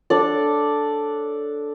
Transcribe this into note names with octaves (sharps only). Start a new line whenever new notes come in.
D4 A4 D5